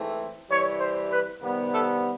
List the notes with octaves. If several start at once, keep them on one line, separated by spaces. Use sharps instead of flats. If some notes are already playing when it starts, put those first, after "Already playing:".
Already playing: G#2 E3 A3 C4
C3 E3 G3 C#5
C5
B4
C3 D#3 G3 B3
A4